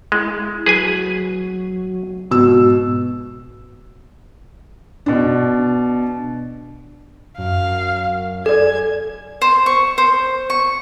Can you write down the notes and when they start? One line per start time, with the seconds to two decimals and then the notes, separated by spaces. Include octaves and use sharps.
0.12 G#3 E4
0.66 F#3 G#4 B4 G#5
2.31 G#2 B2 E6
5.06 B2 D4
7.38 F#2 F5
8.46 A4 D5 G#5 G#6
9.42 C5
9.66 C#6
9.98 C5
10.50 C#6